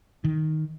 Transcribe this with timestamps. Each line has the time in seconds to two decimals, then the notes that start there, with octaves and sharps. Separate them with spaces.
0.24 D#3